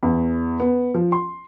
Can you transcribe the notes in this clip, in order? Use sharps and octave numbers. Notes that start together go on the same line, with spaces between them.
E2
B3
F3
C6